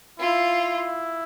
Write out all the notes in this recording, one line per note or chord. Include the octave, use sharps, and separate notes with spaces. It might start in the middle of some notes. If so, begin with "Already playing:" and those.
E4 F4